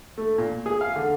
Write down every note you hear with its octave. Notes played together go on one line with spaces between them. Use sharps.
A3
A#2
G#4
F5
D3